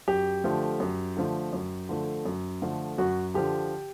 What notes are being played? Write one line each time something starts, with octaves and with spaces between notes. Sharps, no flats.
F#2 G4
D3 F3 A3
F#2
D3 F3 A3
F#2
D3 F3 A3
F#2
D3 F3 A3
F#2 F#4
D3 F3 G4